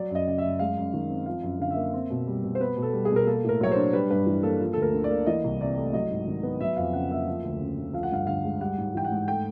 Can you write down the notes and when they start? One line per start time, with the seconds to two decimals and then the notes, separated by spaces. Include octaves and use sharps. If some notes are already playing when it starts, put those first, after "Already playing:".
Already playing: F#3 D5
0.10 F#2 D#5
0.27 C#3 D#5
0.38 F#2 E5
0.59 G#3 F5
0.77 F#2
0.93 D#3
1.10 C4
1.26 F3 F5
1.43 F#2
1.60 D3 F5
1.71 E5
1.76 A#3
1.93 C4
2.10 B2
2.27 G3
2.44 B2
2.55 C5
2.60 B3 B4
2.77 B2
2.82 A4
2.93 G3
3.05 G#4
3.11 B2
3.16 A#4
3.26 A#3 A4
3.44 A2 A#4
3.61 F#3 C#5
3.72 D4 C5
3.93 G3 B4
4.10 G2 B4
4.26 E3
4.43 A#3 A4
4.60 F3
4.73 D2 A4
4.82 A#4
4.93 D3
5.04 D5
5.11 A#3
5.26 E3 D#5
5.44 C2
5.61 C3 D5
5.77 A3
5.93 F#3 D#5
6.10 G#2
6.27 D#3
6.43 B3
6.61 F#3 E5
6.77 F2 F5
6.93 C#3 F#5
7.11 A#3 E5
7.27 F3
7.44 D2
7.60 C#3
7.78 D2
7.93 F3 F5
8.03 F#5
8.11 G2 F5
8.27 D3 F5
8.44 G#3
8.60 G3 F#5
8.78 G#2
8.94 E3 G5
9.05 F#5
9.11 G#2
9.28 A3 G5